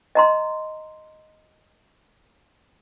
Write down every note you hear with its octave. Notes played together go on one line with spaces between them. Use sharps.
D#5 A#5 C6